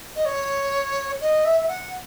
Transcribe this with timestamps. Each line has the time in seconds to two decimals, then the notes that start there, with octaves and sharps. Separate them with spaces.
0.16 D#5
0.25 C#5
1.21 D#5
1.45 E5
1.61 E5
1.68 F#5